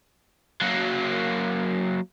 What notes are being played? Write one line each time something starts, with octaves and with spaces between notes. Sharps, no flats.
F#3 A#3